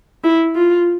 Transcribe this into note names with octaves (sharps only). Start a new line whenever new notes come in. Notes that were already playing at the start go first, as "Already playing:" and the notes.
E4
F4